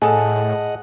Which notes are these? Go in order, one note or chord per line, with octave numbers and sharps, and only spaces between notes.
A2 G#4 A4 D#5 F#5 A5